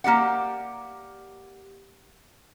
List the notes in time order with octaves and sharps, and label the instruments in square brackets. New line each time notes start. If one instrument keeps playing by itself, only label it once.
[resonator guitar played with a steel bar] A#3 G4 D5 F#5